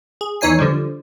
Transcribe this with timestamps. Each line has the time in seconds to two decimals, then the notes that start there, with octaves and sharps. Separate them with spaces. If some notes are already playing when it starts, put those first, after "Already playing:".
0.21 G#4
0.41 E2 E3 D#4 C#5 G#5 C7
0.59 D3 F3 G3